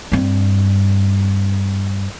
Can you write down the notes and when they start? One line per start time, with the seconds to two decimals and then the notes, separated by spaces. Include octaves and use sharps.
0.12 G2 C4